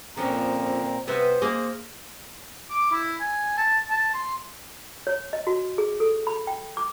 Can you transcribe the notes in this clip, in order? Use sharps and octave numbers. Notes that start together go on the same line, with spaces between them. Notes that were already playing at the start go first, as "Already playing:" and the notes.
A#2 D3 F3 C4 C#4 A#5
C3 B3 C5 E5
A#3 G#4 D#5
D6
E4
G#5
A5
A5
C6
C#5
D#5
F#4
G#4
A4
B5
G5
D6